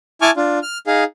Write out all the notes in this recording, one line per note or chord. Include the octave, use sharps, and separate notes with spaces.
E4 G#5 A5 C#6 D6 F6
D4 F4
F6
D#4 G#4 F5